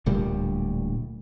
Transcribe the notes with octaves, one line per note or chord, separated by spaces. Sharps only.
D1 D2 A#2 G3